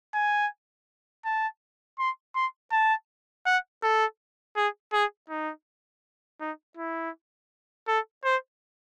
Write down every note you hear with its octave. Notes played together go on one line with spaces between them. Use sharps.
G#5
A5
C6
C6
A5
F#5
A4
G#4
G#4
D#4
D#4
E4
A4
C5